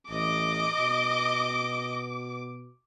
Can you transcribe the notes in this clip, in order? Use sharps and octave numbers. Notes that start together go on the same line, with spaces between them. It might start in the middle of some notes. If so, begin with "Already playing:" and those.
A1 D#5 D6
B2